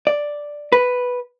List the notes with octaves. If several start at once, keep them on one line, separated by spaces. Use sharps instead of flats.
D5
B4